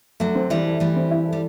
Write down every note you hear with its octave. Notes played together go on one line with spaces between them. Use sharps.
D3 F#3 A3
C4
E3 G3 E4
A4
E3 G3 A3
C4
E4
A4
G3